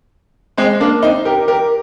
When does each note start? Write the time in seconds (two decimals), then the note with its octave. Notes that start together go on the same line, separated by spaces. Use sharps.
0.58 G#3 C4
0.80 A#3 D4
1.03 C4 D#4
1.25 G4 A#4
1.48 G4 A#4